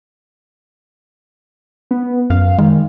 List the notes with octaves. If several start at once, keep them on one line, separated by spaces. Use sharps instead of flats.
B3
F#2 F5
D#3 G#3